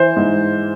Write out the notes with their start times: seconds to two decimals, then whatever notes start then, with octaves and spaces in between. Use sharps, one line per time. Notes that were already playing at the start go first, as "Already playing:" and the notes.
Already playing: E3 C5
0.16 G#2